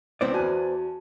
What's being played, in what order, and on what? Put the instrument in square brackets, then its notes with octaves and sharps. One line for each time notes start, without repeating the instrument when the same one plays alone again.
[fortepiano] C#2 E3 C4 [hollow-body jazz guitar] B3 C5 D5
[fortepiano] E2 B4 G#5 [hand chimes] F#4 A5